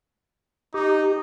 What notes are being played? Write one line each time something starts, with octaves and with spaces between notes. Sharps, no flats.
D#4 G4